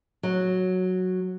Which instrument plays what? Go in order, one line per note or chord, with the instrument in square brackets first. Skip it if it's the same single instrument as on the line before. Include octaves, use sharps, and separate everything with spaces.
[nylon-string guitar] F#3